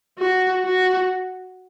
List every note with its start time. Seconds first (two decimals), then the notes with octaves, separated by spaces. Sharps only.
0.19 F#4
0.65 F#4